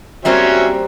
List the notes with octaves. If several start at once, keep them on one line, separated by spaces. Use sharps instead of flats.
F#3 G3 A#3 C4 C#4 E5